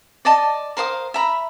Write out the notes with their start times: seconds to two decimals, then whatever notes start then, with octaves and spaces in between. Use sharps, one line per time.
0.25 D5 D#5 A5
0.77 A#4 C5 F5 D#6
1.14 E5 A#5 B5